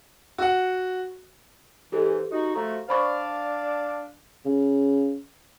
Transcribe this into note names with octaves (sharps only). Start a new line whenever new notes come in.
F#4 F#5
G#2 E3 G4 A4
D#4 F#4
F3 A3 F#4 A#5
D4 C5 D5 F5 B5 C#6
C#3